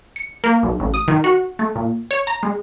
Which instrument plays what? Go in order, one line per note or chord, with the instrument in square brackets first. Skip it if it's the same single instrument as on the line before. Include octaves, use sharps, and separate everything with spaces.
[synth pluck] C#7
A#3
B1
A1
D#6
D#3
F#4
A3
A#2
C#5
A#5
G#3